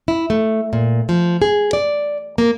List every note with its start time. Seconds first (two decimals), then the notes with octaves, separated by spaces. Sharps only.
0.08 E4
0.30 A3
0.73 A#2
1.09 F3
1.42 G#4
1.73 D5
2.38 A#3